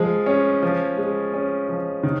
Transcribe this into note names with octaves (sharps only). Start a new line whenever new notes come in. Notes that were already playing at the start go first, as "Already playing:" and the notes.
Already playing: F3 G#3
C#4
F3
G#3
C#4
F3
D#3